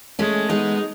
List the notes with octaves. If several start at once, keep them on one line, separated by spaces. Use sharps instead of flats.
G#3 A3 C#4
G#3 B3 D#4